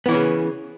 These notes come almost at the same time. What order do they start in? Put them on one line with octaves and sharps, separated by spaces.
B3 E3 C#4 C#3